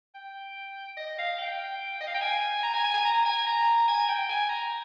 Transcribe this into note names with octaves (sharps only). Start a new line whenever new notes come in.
G5
D#5
F5
G5
D#5
F5
G5
G#5
A#5
G#5
G#5
G#5
A#5
G#5
A#5
G#5
G5
G#5
A#5